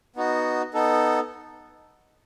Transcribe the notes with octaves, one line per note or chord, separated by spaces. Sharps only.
B3 D#4 F#4
B3 D#4 A4